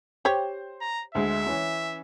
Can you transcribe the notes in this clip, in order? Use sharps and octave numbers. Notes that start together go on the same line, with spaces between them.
G4 C5 C#5
A#5
D2 G#3 E5
E3 C#4